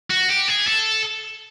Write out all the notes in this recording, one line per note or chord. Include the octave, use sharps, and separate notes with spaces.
F#4
G4
G#4
A4